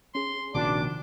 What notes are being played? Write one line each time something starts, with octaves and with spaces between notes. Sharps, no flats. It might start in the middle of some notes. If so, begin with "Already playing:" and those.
C#4 G#4 C6
A#1 C3 D#3 D4 F#4 D6